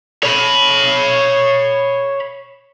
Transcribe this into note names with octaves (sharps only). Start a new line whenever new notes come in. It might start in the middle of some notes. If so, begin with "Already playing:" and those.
C#5 B5